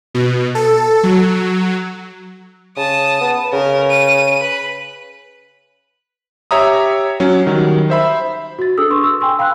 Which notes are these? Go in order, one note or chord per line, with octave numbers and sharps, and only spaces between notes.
B2
A4
F#3
C#3 A5 D#6
B3
C#3 A#4
D#7
B4
G4 C#5 E5 A#5 D#6
F#3 C#4
D#3 F#3 G3
C5 E5 B5
F#4 A6
D4 G#4 A4 D#6 E6
B4 C6 C#6
E6
G5 G#5 C6 E6
F5 G5 B5 E6 F#6